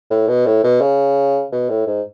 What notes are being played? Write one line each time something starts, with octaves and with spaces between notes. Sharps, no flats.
A2
B2
A2
B2
C#3
B2
A2
G#2